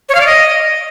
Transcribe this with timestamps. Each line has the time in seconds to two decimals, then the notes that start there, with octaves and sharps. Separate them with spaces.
0.09 C#5
0.15 F5
0.21 D5
0.26 D#5